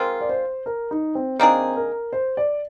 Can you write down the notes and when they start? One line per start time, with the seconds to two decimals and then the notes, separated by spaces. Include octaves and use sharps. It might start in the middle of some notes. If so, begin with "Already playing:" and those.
Already playing: G#3 C4 F4 A#4
0.21 D5
0.29 C5
0.66 A#4
0.91 D#4
1.15 C4
1.39 D#3 A#3 C4 D4 G#4
1.76 A#4
2.13 C5
2.37 D5